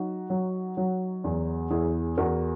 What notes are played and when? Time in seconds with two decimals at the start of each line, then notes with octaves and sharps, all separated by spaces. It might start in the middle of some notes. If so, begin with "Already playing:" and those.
Already playing: F#3 D#4 F#4
0.30 F#3
0.77 F#3
1.24 E2
1.70 E2 E4 G#4
2.18 E2 F#4 A#4